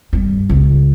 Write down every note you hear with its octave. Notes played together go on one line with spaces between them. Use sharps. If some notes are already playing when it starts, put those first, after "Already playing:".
G2
C#2